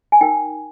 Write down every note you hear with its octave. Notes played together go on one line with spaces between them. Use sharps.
G#5
D#4 A#4 G5